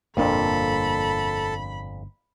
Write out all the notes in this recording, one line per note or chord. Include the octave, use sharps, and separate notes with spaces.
G1 F2 A#2 A#3 D4 A4 B5